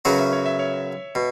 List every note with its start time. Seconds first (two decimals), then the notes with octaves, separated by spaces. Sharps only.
0.05 F#2 C#3 F#3 B3 F#4 C#5
0.18 E5
0.33 C#5
0.46 E5
0.59 C#5
1.15 B2